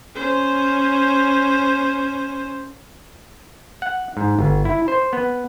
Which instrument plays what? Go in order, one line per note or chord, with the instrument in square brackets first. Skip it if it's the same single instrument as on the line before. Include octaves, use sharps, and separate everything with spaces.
[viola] C#4 C5
[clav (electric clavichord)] F#5
G#2
G1
E4
C5
B3